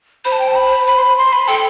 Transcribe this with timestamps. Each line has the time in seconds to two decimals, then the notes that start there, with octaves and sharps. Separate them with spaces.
0.25 C5 B5
0.32 A5
0.39 G5
0.48 A5
0.55 B5
0.87 B5
0.98 C6
1.02 B5
1.17 C6
1.33 B5
1.48 A4 G5